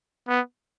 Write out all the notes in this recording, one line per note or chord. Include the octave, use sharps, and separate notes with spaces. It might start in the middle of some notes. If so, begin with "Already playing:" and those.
B3